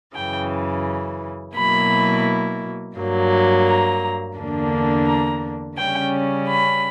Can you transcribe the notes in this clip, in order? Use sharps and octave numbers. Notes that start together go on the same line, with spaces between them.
F#2 C#3 E3 G5
B2 F#3 A#3 E4 B5
G2 F#3 A#3
A#5
E2 D3 A#3 D4
A#5
C#3 G3 C#4 G5
B5